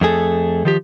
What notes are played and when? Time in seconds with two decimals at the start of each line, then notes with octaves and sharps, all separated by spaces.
0.01 F2 A3 G#4 A4
0.65 D#3 F3 G4